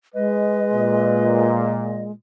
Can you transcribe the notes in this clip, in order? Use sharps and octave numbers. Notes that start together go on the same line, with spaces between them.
G#3 B4 D#5
A#2